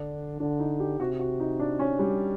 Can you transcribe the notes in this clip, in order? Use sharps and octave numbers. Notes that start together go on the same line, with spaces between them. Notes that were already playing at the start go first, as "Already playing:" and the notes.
Already playing: D3 D4
D3 D4
D#4
G4
C3 F#4
F#4
D#4
D4
C#4
G3